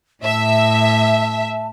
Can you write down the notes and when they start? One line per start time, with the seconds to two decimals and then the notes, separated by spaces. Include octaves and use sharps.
0.24 A2 E5 A5